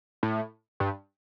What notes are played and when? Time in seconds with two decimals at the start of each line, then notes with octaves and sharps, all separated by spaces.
0.23 A2
0.80 G2